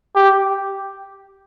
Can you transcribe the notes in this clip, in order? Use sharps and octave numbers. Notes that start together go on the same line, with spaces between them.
G4